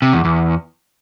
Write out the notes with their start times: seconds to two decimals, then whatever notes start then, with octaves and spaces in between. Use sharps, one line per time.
0.02 C3
0.13 E2
0.25 E2